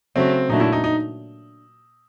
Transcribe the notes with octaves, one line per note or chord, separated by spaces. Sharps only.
C#3 F#3 A3 C4
A#2 F#3 A3 D4 D#4
E4
D#4
D#4